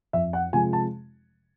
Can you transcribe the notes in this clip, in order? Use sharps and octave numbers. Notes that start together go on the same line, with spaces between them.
F2 E5
F#5
C3 F3 G#3 G#5
A5